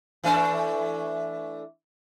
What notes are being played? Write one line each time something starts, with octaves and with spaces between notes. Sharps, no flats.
E3 A3 D4